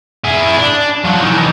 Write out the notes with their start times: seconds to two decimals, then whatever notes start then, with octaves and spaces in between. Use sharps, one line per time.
0.24 E4 G#4
0.58 D4
1.05 F3 F#3
1.22 E3 D#4